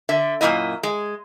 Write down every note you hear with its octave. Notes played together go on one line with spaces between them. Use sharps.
D3 E5
F#2 A#2 D#3 A#3 E4 D#5
G#3